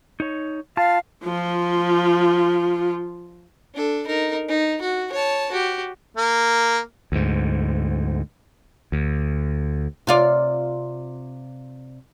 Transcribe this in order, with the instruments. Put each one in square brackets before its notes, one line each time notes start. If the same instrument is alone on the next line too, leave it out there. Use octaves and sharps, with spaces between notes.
[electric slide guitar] D#4 C#5
[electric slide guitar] F4 A5 [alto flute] F5
[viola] F3 F4
[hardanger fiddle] D4 A4
D#4 A#4
D#4
F#4
C#5 A5
F#4 G4
[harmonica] A#3
[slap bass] D2 G#2
D2
[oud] C3 F4 D5